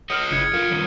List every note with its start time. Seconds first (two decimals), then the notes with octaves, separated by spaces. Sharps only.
0.10 G#4 C#5 D#5 D#6 F6 F#7
0.31 G1 C#3 E4 D#6 G#6 C#7
0.53 F2 F4 A#4
0.70 G2 D#3 C#4